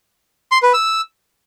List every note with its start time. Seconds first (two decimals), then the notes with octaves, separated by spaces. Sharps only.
0.52 C6
0.63 B4
0.73 E6